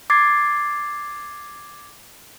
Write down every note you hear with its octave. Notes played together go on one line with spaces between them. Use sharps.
D6 G#6 A6 C7